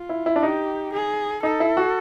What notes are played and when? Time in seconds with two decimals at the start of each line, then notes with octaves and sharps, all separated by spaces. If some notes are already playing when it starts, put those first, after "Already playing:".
Already playing: F4
0.09 E4
0.26 E4
0.36 D4
0.43 D#4 G4
0.93 G#4
1.43 D#4 A4
1.60 E4
1.77 F#4